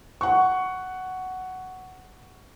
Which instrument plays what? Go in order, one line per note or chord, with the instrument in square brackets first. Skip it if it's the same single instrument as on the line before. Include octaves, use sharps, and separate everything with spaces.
[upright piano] F#5 C#6